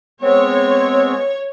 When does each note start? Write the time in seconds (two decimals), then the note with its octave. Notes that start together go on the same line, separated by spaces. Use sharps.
0.22 G#3 B3 C4 C#5